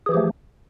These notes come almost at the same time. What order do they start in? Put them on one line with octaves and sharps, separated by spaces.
G#4 E3 G4 F3 A3